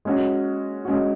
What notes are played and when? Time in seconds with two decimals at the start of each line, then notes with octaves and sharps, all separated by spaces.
0.05 G#3 C#4 F#4
0.85 G#3 C#4 F#4